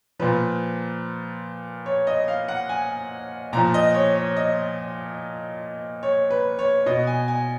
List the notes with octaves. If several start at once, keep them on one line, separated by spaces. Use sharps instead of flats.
A#2 F3 B4
C#5
D#5
F5
F#5
G#5
A#2 F3 A#5
D#5
C#5
C#5
D#5
C#5
B4
C#5
B2 D#5
G#5
G#5